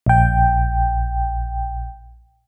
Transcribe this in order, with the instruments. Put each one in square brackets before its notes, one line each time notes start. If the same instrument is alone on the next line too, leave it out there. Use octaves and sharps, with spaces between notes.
[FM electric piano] A#1 G5